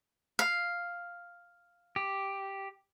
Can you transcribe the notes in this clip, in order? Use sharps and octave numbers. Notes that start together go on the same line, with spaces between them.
F5
G4